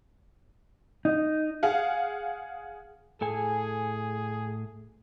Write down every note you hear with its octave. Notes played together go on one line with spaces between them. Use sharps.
D#4
G#4 F5 F#5
A2 G#4 A4 G#5